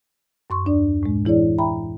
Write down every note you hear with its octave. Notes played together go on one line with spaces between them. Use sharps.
F#2 C6 C#6
D#2 D4 D5
A2 G#3
E3 E4 G#4 C#5 D5
E5 G5 A#5 B5